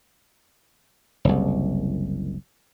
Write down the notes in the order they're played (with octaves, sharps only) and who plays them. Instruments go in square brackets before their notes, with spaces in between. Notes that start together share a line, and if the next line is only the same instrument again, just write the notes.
[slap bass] F#1 C2